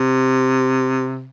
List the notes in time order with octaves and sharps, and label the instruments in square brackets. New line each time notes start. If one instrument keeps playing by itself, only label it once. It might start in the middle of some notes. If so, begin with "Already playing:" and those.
Already playing: [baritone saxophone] C3